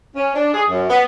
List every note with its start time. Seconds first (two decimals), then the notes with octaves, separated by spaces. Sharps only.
0.15 C#4
0.35 D4
0.54 G#4
0.70 F#2
0.89 B3